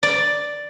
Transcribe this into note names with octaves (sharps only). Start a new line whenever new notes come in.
D5